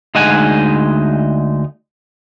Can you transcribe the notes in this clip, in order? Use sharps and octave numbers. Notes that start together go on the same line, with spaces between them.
D2 G#3 D#4 D#5 F#5 G#5